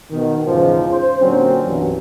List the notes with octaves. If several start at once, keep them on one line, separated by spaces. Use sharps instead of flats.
B2 D#3
E2 G#2 C#3 F3
C5
A#2 D3 F#3 C4 C#4
C2 G2 B2 E3 F#3